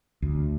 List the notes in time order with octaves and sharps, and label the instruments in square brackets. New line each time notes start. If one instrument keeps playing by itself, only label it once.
[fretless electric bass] D2